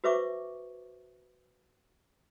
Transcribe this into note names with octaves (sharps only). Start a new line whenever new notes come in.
F#4 B4 C5 E5 C#6 D6